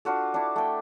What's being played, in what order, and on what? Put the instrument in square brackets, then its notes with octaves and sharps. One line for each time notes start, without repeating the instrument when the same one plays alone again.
[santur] D4 F4 F#4 A4
D4 E4
A3 G5